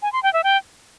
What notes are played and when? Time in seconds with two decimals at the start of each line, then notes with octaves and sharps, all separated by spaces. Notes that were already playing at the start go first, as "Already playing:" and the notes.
0.02 G#5
0.13 C6
0.23 G5
0.33 E5
0.44 G5